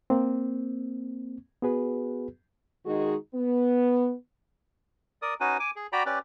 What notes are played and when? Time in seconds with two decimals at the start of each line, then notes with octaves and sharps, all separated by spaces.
0.10 A#3 C4
1.62 B3 F#4 G#4 B4
2.85 D#3 G#3 D#4 F#4 G#4
3.34 B3
5.22 A#4 D5 D#6
5.40 C#4 D#4 F#4 B4 G#5
5.60 G#5 D6
5.76 G#4
5.93 F#4 D5 G5 A#5 B5
6.06 C#4 G4 B4 D5